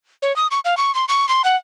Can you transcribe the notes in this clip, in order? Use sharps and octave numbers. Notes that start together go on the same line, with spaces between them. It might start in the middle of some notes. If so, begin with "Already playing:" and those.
C#5
D#6
C#6
F5
C#6
C6
C#6
C6
F#5